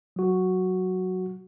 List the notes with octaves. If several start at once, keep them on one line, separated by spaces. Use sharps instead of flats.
F#3 F#4